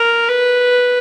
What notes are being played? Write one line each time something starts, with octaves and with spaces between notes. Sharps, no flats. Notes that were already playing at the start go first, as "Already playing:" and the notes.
Already playing: A#4
B4